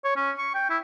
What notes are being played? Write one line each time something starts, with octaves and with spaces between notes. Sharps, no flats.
C#5
C#4
C#6
G5
E4